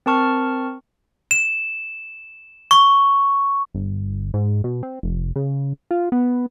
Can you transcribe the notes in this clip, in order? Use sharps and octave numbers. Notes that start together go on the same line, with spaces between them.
C4 A#4 A5 C#6 F6
E7
C#6
G1
G#2
B2
C4
F1
C#3
F4
B3